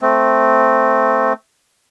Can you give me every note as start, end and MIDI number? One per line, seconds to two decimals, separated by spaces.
0.02 1.33 57
0.02 1.33 60